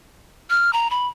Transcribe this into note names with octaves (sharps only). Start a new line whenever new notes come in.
F6
A#5
B5